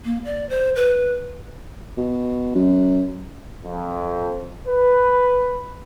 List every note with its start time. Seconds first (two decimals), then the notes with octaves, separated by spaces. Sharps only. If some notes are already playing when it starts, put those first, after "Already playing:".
0.05 A#3
0.25 D5
0.49 C5
0.76 B4
1.97 B2
2.55 F#2
3.65 F2
4.66 B4